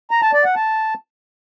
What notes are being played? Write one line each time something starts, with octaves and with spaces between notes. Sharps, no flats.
A#5
A5
D5
F#5
A5